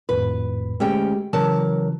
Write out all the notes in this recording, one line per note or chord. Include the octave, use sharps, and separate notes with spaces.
G#1 F2 A2 B4
D2 G#3 C#4 G4 G#4 G5
C#3 E3 F#3 A#4 A5